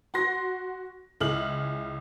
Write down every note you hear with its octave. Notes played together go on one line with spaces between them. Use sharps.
F#4 C6 A#6
C#2 E4 G#4 E5 F6 F#7